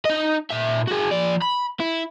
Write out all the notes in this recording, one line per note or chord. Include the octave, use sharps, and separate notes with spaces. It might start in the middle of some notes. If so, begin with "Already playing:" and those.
D#4 D#5
A#2 E5
F#4 G#4
F3 D5
B5
E4